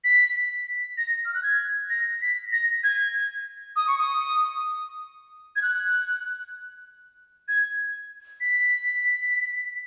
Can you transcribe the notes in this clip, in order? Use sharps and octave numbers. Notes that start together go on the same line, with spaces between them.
B6
A#6
F6
F#6
G#6
A#6
B6
A#6
G#6
D#6
C#6
D#6
G#6
F#6
G#6
B6